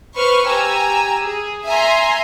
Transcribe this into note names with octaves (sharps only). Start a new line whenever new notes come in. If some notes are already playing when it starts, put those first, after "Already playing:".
B4 C5 C#6 F6
G4 G#5 A#5 E6
G#4
E5 G#5 A#5 C6